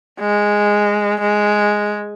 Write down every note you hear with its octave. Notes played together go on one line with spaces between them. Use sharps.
G#3
G#3